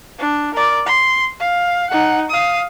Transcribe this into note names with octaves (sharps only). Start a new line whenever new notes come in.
D4
A#4 D5
C6
F5
D#4 F#5
F5 D#6